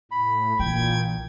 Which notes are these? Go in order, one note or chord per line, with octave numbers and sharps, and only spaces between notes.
A2 B5
A#1 A#2 E3 G5 G#6